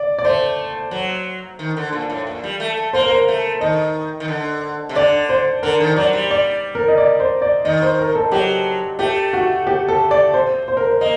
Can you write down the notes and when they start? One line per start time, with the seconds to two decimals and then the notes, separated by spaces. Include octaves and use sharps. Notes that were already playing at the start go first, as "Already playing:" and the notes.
Already playing: D5
0.19 D5
0.24 A3 C5
0.91 F#3
1.59 D#3
1.77 D3
1.93 A#2
2.10 A2
2.27 A#2
2.44 G3
2.60 A3
2.77 A3
2.93 A#3 C5
3.02 A#4
3.10 C5
3.28 A3
3.61 D#3 D#5
4.20 D#3
4.28 D3
4.89 C3
4.96 D3 D5
5.29 C5
5.63 D3 A#4
5.80 D#3
5.96 F#3 D5
6.13 G3
6.31 D5
6.75 A#4
6.88 D#5
6.98 D5
7.20 C5
7.42 D5
7.65 D#3 D#5
7.82 C5
7.99 A#4
8.15 A4
8.31 F#3 G4
8.99 A3 G4
9.33 F#4
9.67 G4
9.88 A4
10.11 D5
10.34 C5
10.68 C5
10.77 A#4
10.87 C5
11.01 A#3 D#5